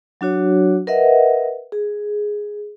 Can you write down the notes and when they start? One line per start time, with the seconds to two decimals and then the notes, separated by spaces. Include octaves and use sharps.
0.21 F#3 D4 F#4 C#5
0.87 A#4 B4 D#5 E5 F#5
1.72 G#4